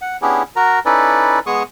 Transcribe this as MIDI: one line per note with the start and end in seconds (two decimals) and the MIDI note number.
0.01 0.17 78
0.22 0.43 59
0.22 0.43 61
0.22 0.43 62
0.22 0.43 64
0.22 0.43 67
0.22 0.43 68
0.56 0.79 66
0.56 0.79 70
0.56 0.79 82
0.86 1.39 61
0.86 1.39 63
0.86 1.39 64
0.86 1.39 69
0.86 1.39 71
0.86 1.39 74
1.46 1.63 56
1.46 1.63 59
1.46 1.63 68
1.46 1.63 85
1.46 1.63 87